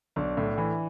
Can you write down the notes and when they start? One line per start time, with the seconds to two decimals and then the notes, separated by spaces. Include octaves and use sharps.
0.16 B1 D4
0.37 A2
0.58 E3